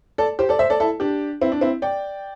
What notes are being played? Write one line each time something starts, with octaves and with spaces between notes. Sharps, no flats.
A4 D5
G4 C5
A4 D5
C5 E5
A4 D5
E4 A4
D4 G4
C4 E4
D4
C4 E4
D5 G5